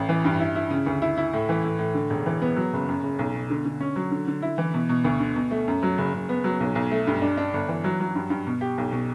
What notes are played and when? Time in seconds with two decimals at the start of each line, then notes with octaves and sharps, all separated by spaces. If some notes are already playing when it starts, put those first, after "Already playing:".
Already playing: A1
0.09 E3
0.25 G2
0.40 E4
0.56 E4
0.70 C#3
0.86 D2
1.02 E4
1.18 E4
1.33 A2
1.49 E3
1.64 A2
1.79 A2
1.94 D3
2.10 E1
2.26 E3
2.42 B3
2.56 F#3
2.73 F#1
2.89 F#2
3.03 F#1
3.19 B1
3.35 B2
3.50 D3
3.65 D3
3.81 C#4
3.96 F#3
4.11 D3
4.28 D3
4.42 E4
4.58 E3
4.74 B2
4.89 B2
5.04 D2
5.20 D3
5.36 B2
5.51 A3
5.68 F#2
5.83 F#3
5.98 F#1
6.14 F#1
6.29 B3
6.44 F#3
6.60 B1
6.75 B1
6.91 A3
7.07 G2
7.22 D4
7.37 D4
7.53 G1
7.68 E3
7.84 F#3
8.00 F#3
8.15 G2
8.30 G2
8.47 B2
8.61 G4
8.78 B1
8.92 B2